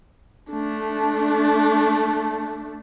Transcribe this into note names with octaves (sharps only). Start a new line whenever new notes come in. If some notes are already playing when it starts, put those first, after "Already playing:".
A3 D4